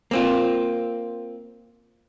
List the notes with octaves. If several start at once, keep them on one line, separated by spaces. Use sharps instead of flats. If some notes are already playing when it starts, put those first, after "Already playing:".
A#3 C4 F4